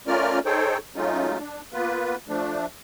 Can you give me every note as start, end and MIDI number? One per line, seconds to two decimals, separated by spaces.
0.07 0.39 57
0.07 0.39 61
0.07 0.39 65
0.07 0.39 70
0.07 0.39 74
0.07 0.39 89
0.46 0.78 63
0.46 0.78 68
0.46 0.78 69
0.46 0.78 72
0.46 0.78 73
0.46 0.78 79
0.96 1.38 54
0.96 1.38 56
0.96 1.38 57
0.96 1.38 61
0.96 1.38 63
0.96 1.38 65
1.40 1.61 62
1.73 2.16 58
1.73 2.16 59
1.73 2.16 65
1.73 2.16 71
2.28 2.66 53
2.28 2.66 57
2.28 2.66 62